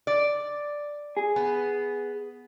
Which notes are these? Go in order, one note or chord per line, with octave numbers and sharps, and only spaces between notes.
D5
G#4
B3